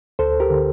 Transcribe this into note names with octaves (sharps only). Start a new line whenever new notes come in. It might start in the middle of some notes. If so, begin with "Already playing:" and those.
D2 A4 C5
G4 A#4
D3